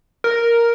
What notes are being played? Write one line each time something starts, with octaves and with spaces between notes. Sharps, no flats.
A#4